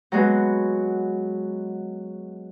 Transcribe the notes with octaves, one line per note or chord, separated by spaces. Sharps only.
F#3 G#3 B3